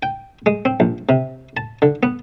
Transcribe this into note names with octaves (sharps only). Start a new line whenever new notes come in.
G5
G#3
C4
A#1
C3
A5
D3
B3